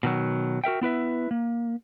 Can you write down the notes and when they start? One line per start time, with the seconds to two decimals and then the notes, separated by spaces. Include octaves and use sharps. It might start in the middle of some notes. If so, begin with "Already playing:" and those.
0.03 B2 D#3 F#3
0.64 F#4 A#4 E5 G5
0.81 B3 E4 B4 E5
1.31 A#3